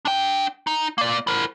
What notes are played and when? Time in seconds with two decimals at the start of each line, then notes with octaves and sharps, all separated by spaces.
0.05 D4 G5
0.67 D#4
0.98 A#3 D5
1.27 E4 A#4